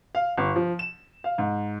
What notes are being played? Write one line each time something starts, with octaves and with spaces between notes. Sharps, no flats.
F5
G1
F3
E7
F5
G#2